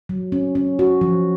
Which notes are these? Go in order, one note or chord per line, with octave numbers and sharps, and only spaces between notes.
F#3
C#4
C#4
F#4
F3